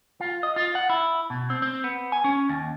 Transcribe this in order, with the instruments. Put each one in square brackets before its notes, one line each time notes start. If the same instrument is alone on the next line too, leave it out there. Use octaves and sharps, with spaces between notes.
[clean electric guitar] F4
D#5
F4
F#5
E4
B2
C4
C4
B3
G#5
C#4
D#2